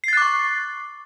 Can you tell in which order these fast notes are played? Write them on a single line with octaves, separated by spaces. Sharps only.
C7 A6 F#6 D6 C#6